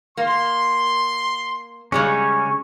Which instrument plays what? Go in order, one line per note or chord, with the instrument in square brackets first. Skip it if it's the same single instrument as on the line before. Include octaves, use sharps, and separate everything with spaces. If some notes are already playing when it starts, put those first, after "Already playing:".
[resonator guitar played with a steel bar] A#3 [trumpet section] C6
[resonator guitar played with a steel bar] C#3 G3 G#3 [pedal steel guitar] C#4 C#5